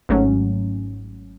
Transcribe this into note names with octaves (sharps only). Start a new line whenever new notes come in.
G#1 G#2 F#3 A3 C#4